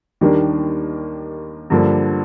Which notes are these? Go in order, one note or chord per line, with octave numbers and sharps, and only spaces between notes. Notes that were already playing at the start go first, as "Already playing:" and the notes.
D#2 D#3 G3 A#3 D4
G2 D3 F3 A#3 D4